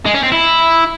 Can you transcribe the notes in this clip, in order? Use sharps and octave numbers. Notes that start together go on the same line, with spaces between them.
G#3
C#4
C4
E4